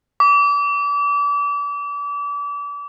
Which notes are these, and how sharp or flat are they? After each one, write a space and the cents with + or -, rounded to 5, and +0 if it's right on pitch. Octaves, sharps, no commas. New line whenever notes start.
D6 -35